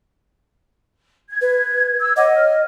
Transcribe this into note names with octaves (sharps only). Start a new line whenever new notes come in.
G#6
B4
E6 G#6
C#5 D#5 F#5 D6
C#5 F6